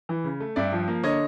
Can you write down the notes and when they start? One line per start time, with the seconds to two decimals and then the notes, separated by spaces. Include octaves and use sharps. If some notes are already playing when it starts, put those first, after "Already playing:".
0.09 E3
0.24 C#3
0.40 A3
0.56 G2 D5 E5
0.72 F3
0.88 A#3
1.03 D3 C#5 D#5